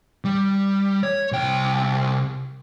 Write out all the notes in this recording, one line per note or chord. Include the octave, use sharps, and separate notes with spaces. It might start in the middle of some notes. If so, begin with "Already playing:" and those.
G3
C#5
C2 G5